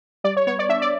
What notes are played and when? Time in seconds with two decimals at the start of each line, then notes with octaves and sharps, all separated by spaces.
0.24 G3 D5
0.37 C#5
0.47 B3 C#5
0.59 D5
0.69 D4 E5
0.82 D5